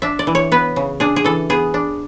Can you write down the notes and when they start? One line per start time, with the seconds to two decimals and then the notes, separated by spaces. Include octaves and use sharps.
0.02 D4 E5
0.19 D5
0.27 E3
0.35 C#5
0.52 B3 B4
0.76 C#3
1.00 D4 G#4
1.16 G#4
1.24 E3 A4
1.50 B3 G#4
1.74 D4